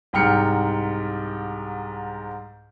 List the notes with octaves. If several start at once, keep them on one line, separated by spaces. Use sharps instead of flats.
C2 G#2 G5 F6 C#7